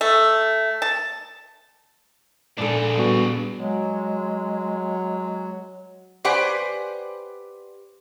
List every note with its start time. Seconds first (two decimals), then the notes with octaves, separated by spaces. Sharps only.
0.01 A3
0.82 A5
2.58 A#2 D4 G#4 A4
2.98 G3 B3 F#4
3.57 F#3 G#3
6.24 G4 B4 C5 D5 F#5 G#5